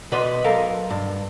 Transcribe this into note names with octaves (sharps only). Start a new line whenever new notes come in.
B2 B4 D5 D#5 C6
B1 A4 A#4 F5
G2